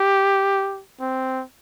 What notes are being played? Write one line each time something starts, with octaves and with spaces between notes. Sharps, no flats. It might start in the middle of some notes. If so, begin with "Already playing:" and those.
Already playing: G4
C4